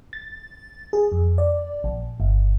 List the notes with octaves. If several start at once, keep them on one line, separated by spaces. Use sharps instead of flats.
A6
G#4
F2
D5
A#1
G1